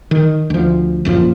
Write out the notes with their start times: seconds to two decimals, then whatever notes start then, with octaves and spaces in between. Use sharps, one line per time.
0.11 D#3
0.50 D2 F3
1.05 A#1 F#2 D#3 F3